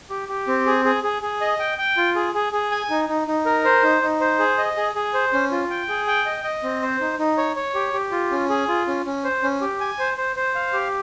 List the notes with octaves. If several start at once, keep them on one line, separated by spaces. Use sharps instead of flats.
G4
G4
C4
G#4
G#4
G#4
G#4
D#5
G5
G5
F4
G#4
G#4
G#4
G#5
D#4
D#4
D#4
A#4
C5
D#4
D#4
C5
G#4
D#5
G#4
G#4
C5
C#4
F4
G5
G#4
G5
D#5
D#5
C4
C5
D#4
D#4
C#5
C#5
G4
G4
F4
C#4
G#4
F4
C#4
C#4
C5
C#4
G4
G#5
C5
C5
C5
F5
G4